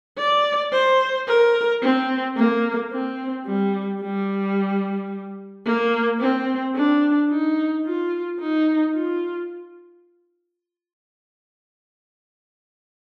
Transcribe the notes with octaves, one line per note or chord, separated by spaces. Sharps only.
D5
C5
A#4
C4
A#3
C4
G3
G3
A#3
C4
D4
D#4
F4
D#4
F4